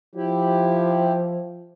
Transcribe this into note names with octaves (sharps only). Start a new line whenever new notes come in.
F3 E4 G4